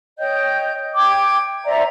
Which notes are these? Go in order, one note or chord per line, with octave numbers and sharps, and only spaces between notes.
C#5 D#5 G5 G6
G5 D6 G#6
C5 D5 E5 A#5